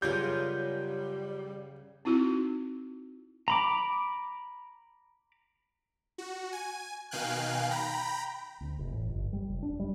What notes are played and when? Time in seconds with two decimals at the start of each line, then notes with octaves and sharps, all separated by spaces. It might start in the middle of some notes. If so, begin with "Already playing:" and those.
0.02 F#2 C#3 G3 F4 G#4 A#4 B4 G6
2.05 C4 D#4 E4 F#4
3.48 A#5 B5 D6
6.18 F#4
6.52 G#5
7.11 B2 D#3 F5 G5 G#5 F#6
7.70 G5 A#5 B5
8.61 D2
8.79 F1
8.91 A1
9.09 G1
9.33 G3
9.48 F1
9.63 D4
9.79 G3